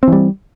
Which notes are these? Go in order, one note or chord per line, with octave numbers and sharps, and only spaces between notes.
E3 G3 C4